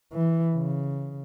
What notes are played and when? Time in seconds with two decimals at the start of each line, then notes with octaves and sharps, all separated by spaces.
0.13 E3
0.56 C#3